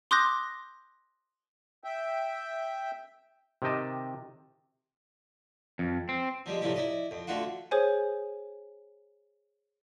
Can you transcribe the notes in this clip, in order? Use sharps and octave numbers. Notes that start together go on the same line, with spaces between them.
C6 D6 D#6 F#6 G6 A#6
E5 G5
C3 D#3 G4 D#5 A5
F2
C4
F3 G3 G#3
A2 C3 F3 G3 E4 G4
E4 D5 D#5
F2
D3 A3 F4 F#4 F#5
G#4 C5 C#5 G#5